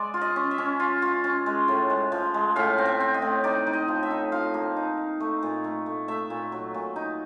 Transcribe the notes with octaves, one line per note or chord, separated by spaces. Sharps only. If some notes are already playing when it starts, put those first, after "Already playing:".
Already playing: G#3 D5
F4
D#5
C#4
E5
C#4
F4
F4
C#4
G#3
A2
G#3
F3
G#3
A2 F5
C4
E5
C4
D#5
A2
D#4 D5
D#4
D#5
F3
E5
D#4
F3 F5
A#3
D#4
D#4
A3
A#2
A3
A3
A3 E5
A#2
F#3
A#2
D#4